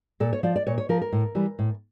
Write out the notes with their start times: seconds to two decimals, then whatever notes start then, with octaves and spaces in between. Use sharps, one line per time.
0.20 A#2 A4
0.33 C#5
0.43 F3 D5
0.56 D5
0.67 A#2 C#5
0.78 C#5
0.89 F3 A#4
1.01 A#4
1.12 A2
1.35 E3 G3
1.59 A2